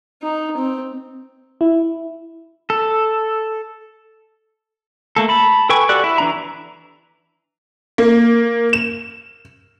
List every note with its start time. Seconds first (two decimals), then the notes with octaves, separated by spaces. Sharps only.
0.22 D#4
0.57 C4
1.61 E4
2.70 A4
5.16 A3 A#3 A4
5.29 A5 B5
5.69 A4 B4 G5 G#5 C#6
5.89 F#4 G4 A4 D5 F#6
6.04 E4
6.18 E3 D4 A#5
7.98 A#3
8.73 E7